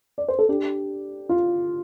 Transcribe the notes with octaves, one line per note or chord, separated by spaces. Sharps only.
D5
C5
A4
D4 G4
F4